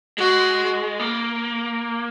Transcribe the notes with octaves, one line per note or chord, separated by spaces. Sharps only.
G#3 F#4
A#3